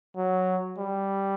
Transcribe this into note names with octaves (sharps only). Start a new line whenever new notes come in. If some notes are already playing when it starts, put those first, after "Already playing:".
F#3
G3